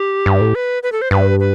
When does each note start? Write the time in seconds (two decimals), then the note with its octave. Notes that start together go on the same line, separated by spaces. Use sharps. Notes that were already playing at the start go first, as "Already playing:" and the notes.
Already playing: G4
0.26 G2
0.41 A2
0.55 B4
0.83 B4
0.92 A4
1.02 C5
1.11 G2 B4
1.40 B4